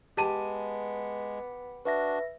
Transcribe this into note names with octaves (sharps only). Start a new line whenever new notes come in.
G#3 B3 G4 A5 D#7
D4 F#4 B4 E5 A#6